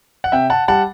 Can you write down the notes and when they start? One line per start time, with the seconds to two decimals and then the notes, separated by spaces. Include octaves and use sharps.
0.24 F#5
0.32 C3 E5 G5
0.50 F#5 A5
0.68 G3 F#5 A5